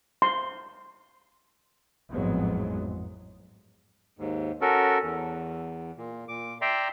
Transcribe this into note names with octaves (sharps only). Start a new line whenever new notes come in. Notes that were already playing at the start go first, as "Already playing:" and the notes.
C6
A1 F2 G#2 F#3 G#3 B3
D#2 G#2
C#4 F#4 A4 A#4
E2
A#2
A#2 D6
D5 E5 G5 A#5 C6